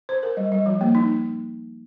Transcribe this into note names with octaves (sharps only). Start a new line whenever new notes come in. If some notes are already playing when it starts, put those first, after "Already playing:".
C5
A#4
G3
G3
F3
A#3
D#4